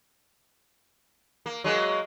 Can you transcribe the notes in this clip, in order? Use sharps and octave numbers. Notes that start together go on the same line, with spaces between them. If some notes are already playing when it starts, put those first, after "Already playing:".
A#3
F#3 G#3 A#3